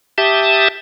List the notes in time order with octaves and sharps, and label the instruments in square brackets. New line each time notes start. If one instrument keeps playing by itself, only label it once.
[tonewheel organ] G4 E5 A5 D#6